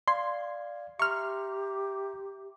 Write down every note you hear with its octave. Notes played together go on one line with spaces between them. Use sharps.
D5 F5 C6 G#6
G4 E5 A#5 C6 C#6 F6